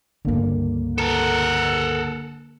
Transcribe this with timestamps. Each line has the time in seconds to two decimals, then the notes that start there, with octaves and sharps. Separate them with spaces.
0.25 C#2 G2 D3 A#3
0.98 A4 A#4 F#5